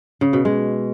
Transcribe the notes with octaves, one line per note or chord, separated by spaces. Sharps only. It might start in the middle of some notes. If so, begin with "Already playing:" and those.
C#3
B2
G#3